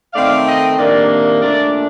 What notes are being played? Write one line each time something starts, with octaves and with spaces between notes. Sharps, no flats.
D#3 A3 C4 D#4 D5 F5
D#5 G5
C3 D#3 A#3 D4 D5 F5
A#2 A3 D4 A#4 D5